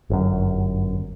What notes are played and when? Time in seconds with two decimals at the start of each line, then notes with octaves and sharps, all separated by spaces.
0.10 G1 F#2